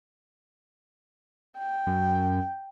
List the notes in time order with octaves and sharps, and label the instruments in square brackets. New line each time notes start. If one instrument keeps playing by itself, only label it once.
[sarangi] G5
[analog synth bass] F#2